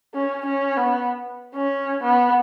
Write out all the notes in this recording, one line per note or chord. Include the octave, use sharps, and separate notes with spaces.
C#4
C#4
B3
C#4
B3